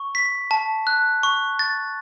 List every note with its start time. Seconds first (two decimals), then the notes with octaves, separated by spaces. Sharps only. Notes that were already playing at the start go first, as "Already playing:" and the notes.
Already playing: C#6
0.15 B6
0.51 A5
0.87 F#6
1.23 C#6
1.59 A6